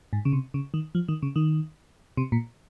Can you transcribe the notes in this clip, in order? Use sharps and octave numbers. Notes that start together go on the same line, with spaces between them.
G#2
C#3
C3
C#3
D#3
F3
D#3
C#3
D#3
C3
A#2